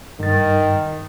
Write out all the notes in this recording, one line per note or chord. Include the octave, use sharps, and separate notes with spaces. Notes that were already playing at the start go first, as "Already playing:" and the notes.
G2 D#3 A6